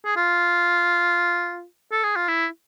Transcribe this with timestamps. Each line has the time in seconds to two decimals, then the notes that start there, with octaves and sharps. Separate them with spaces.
0.05 G#4
0.17 F4
1.92 A4
2.04 G#4
2.16 F4
2.28 E4